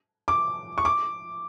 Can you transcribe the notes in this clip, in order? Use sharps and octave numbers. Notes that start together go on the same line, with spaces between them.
D6
C#6
D6